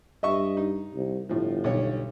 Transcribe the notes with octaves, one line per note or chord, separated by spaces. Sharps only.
G2 D#5 E5 C#6
D#4
C2
G1 A2 F3
B1 D#3 C#5